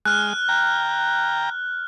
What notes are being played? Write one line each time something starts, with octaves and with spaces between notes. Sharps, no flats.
G#3 F6 F#6
G5 A#5